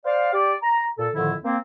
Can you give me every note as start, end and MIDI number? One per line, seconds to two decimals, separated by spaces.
0.06 0.31 72
0.06 0.31 74
0.06 0.31 77
0.33 0.53 67
0.33 0.53 74
0.63 0.86 82
0.98 1.08 46
0.98 1.08 69
1.14 1.33 41
1.14 1.33 45
1.14 1.33 50
1.14 1.33 51
1.14 1.33 53
1.14 1.33 64
1.44 1.57 58
1.44 1.57 60